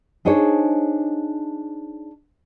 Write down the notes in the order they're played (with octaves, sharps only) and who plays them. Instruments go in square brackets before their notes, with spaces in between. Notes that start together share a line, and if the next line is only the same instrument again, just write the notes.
[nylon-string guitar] D4 D#4 G#4 C5 C#5